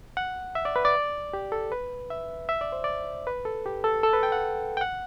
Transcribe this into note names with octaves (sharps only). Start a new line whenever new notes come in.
F#5
E5
D5
B4
D5
G4
A4
B4
E5
E5
D5
C5
D5
B4
A4
G4
A4
A4
B4
G5
F#5
G5
F#5